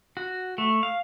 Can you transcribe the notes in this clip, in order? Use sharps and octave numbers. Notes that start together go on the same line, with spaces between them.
F#4
A3
F5